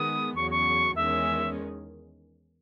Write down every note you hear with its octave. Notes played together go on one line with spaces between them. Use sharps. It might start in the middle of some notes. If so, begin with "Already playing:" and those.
Already playing: D#3 G#3 B3 D#6
E2 C#3 F#3 C#6
C#6
E2 D#3 G#3 C#4 E5